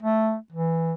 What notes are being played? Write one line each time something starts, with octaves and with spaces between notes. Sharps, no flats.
A3
E3